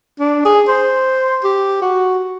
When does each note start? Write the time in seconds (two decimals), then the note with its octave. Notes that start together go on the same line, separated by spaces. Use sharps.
0.19 D4
0.45 G#4
0.68 C5
1.44 G4
1.82 F#4